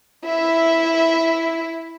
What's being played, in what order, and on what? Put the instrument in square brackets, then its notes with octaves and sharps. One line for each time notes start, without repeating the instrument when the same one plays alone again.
[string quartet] E4 E5